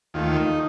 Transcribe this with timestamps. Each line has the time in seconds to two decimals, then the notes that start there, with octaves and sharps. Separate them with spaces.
0.14 D#2 D#3 A3 F4
0.32 F4
0.36 D#4